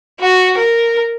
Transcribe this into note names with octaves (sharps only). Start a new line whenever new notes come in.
F#4
A#4